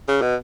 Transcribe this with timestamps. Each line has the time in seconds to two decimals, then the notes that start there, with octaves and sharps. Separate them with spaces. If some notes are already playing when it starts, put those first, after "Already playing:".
0.08 C#3
0.22 B2